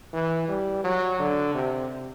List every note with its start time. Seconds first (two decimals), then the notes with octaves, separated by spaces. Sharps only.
0.13 E3
0.48 G3
0.84 F#3
1.19 D3
1.54 C3